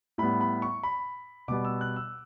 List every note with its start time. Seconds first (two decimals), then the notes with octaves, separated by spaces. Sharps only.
0.18 A2 G3 B3 B5
0.41 B5
0.62 C#6
0.83 B5
1.48 B2 G3 B3 D6
1.65 E6
1.81 F#6
1.96 E6